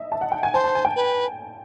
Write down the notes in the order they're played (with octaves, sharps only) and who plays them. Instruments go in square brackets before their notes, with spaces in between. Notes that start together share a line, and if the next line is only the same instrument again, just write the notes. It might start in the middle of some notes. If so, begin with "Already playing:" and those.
Already playing: [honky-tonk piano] D#5 E5
A5
F#5
G5
G#5
[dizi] C5 [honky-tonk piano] A5
[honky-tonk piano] A5
G#5
G5
[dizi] B4